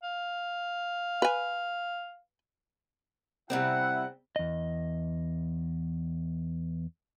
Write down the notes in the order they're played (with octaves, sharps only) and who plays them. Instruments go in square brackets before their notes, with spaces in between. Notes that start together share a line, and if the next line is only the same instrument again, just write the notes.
[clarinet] F5
[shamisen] B4 G#5
[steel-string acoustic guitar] C3 G3 C4 [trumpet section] E4 E5 F#5
[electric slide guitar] E2 D#5